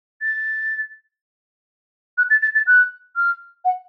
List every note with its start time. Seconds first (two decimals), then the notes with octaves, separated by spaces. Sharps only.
0.22 A6
2.18 F#6
2.30 A6
2.42 A6
2.55 A6
2.67 F#6
3.16 F6
3.64 F#5